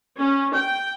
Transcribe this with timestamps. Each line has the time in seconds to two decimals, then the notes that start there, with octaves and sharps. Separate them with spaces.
0.20 C#4
0.55 G5